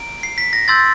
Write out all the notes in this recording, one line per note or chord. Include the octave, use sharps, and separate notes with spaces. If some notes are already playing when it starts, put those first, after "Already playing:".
Already playing: A#5 D7
C7
B6
A#6
C6 E6 G6 A6